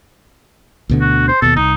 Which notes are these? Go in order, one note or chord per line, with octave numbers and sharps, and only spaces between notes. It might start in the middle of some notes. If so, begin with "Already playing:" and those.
D2 B2 D3
F#4
C5
D#2 B2 A4
C2 D#4